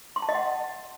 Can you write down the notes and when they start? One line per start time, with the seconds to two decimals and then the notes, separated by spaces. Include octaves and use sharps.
0.16 C6
0.22 A5
0.29 D#5
0.35 F#5